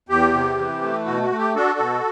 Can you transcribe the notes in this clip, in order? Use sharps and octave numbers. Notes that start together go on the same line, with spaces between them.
E2 G4
C3
E3
A3
B2 F#4
F#4
A3
G4
D4 F#4 A4
B2